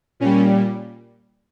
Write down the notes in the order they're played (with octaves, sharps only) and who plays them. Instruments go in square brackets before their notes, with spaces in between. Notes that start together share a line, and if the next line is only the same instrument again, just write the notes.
[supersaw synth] A#2 G3 C#4